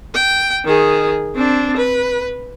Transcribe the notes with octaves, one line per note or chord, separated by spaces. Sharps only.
G5
D#3 G#4
C4 D4
B4